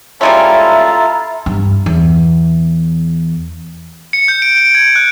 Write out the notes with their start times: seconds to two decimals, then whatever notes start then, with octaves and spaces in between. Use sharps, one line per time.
0.21 G3 G#3 C#4 E4 F4 A4 E5 A#5
1.46 G2
1.86 E2
4.13 C#7
4.28 G6
4.42 D7
4.58 D7
4.75 G#6
4.96 F#6